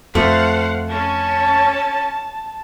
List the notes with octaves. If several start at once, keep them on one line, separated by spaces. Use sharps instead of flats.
F2 A3 C5 F5 F#5
C#4 A5